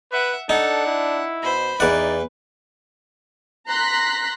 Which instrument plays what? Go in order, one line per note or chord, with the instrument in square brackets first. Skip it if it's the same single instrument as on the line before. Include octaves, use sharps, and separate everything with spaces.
[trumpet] B4 [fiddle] E5 F#5
[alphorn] D4 [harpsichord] D#4 [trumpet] A4 [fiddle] F#5
[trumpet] E4
[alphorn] B2 [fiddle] C5 B5
[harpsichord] E2 F#5 [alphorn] D#4 [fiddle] B4 [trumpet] D5
[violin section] A#5 C6 F#6 A#6 B6